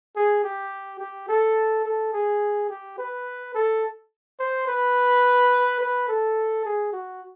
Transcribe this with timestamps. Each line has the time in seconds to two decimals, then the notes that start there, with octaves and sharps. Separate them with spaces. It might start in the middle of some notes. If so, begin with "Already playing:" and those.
0.16 G#4
0.44 G4
0.99 G4
1.28 A4
1.85 A4
2.13 G#4
2.70 G4
2.98 B4
3.54 A4
4.39 C5
4.68 B4
5.80 B4
6.08 A4
6.65 G#4
6.93 F#4